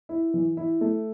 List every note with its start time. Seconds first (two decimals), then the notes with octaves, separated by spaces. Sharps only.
0.09 E4
0.34 E3
0.57 E4
0.81 A3